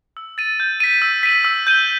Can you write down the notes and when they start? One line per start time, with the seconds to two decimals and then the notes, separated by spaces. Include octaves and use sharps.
0.17 E6
0.38 A6 D#7
0.60 G6
0.80 B6 D#7
1.02 E6
1.23 B6 D#7 F#7
1.44 E6
1.67 G6 D#7 G7